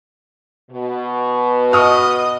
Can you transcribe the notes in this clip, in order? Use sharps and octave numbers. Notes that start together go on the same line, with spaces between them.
B2
D#5 C#6 D#6 F6